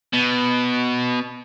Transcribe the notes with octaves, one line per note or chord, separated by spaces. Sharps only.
B2